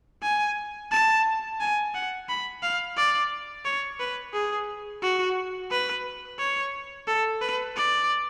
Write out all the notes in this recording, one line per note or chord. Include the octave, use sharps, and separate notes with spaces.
G#5
A5
G#5
F#5
B5
F5
D5
C#5
B4
G#4
F#4
B4
C#5
A4
B4
D5